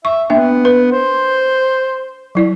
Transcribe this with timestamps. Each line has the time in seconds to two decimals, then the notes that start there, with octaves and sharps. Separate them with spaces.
0.05 E5 C#6
0.30 A#3 B3 D4 E5
0.65 B4
0.92 C5
2.35 F#3 E4 D5